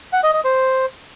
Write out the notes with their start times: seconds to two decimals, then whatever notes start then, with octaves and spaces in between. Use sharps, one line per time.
0.13 F#5
0.23 D#5
0.34 D#5
0.44 C5